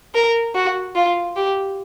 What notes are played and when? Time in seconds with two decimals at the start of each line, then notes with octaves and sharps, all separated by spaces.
0.15 A#4
0.55 F#4
0.96 F4
1.36 G4